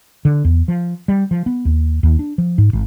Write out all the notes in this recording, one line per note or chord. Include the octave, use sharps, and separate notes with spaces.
D3
E2
F3
G3
F3
B3
D#2
D#2
D4
F3
G#2
G#1